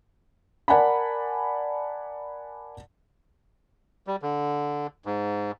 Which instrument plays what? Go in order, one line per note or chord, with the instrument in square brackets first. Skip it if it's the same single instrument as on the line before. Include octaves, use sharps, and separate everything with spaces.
[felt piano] A#4 D5 F#5 G#5 A5 B5
[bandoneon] G3
D3
G#2